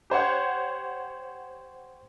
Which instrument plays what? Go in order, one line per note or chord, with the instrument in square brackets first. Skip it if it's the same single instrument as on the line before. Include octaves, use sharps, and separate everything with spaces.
[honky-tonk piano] G4 C5 C#5 F#5